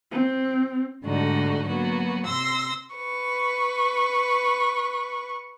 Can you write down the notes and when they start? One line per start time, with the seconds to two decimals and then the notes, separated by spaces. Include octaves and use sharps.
0.11 C4
1.04 G#2 D3 G3 A3 D#4 F#4
1.65 F#3 A#3 B3 F#4
2.25 C3 C6 E6 A#6
2.96 B4 C#6